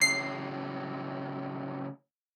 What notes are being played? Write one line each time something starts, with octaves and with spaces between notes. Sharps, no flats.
A2 C#3 F#3 C7